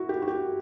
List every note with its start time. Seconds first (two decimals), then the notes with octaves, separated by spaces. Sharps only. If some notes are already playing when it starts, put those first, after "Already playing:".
Already playing: E4 F#4
0.09 G4
0.22 F#4
0.28 G4